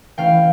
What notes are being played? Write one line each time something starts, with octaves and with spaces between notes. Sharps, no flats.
E3 A3 C#4 E4 F5 G5